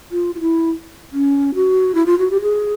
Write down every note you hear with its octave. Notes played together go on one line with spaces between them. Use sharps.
F4
F4
E4
C#4
F#4
E4
F4
F#4
G4
G#4